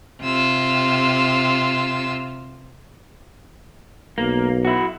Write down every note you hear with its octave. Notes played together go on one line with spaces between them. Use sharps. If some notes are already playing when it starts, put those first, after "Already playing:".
C3 F4 E6
B1 A#3
E4 F#4